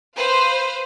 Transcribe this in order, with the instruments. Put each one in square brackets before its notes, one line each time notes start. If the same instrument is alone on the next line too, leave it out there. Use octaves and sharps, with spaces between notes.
[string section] B4 C5 F5